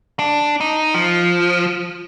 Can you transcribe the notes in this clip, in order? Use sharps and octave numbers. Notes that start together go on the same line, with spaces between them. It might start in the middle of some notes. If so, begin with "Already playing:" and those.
D4
D#4
F3